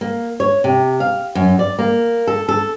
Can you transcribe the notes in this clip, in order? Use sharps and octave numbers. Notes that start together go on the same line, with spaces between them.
A#3
C#5
C3
F5
F#2
D5
A#3
A4
A4